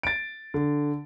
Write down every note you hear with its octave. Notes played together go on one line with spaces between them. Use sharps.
A6 D7
D3